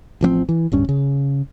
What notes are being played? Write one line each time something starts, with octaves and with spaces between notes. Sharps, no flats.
A1 F3 A#3 C4
E3
D1 G2 C#4
C#3